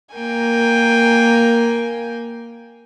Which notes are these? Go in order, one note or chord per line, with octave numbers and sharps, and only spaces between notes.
A#3 A#4 G5 G#5